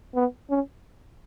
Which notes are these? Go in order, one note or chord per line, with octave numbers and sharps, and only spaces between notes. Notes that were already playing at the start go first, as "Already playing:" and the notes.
B3
C#4